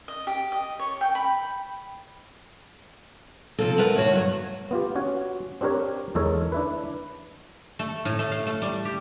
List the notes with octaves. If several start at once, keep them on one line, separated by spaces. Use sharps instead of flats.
D#5
G4
D#5
C#5
G5
B5
C3 F3 A4
E2 A#4 B4 E5 F#5
D2 F#4 C#5 D5
G2 F#3 C#5
B3 F4 G4
C#4 F#4 C#5
C4 D4 G4 A#4 C#5
E2 G#3 A4 A#4 C#5
D4 E4 B4
A3
A2
A3
F5
A3
G3
G4